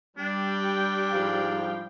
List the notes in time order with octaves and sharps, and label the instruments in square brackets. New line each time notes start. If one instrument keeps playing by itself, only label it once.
[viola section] G3 G5 [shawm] D4
[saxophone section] G#2 F3 F5